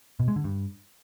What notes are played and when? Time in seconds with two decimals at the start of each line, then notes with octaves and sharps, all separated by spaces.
0.20 B2
0.28 G#3
0.36 D3
0.44 G2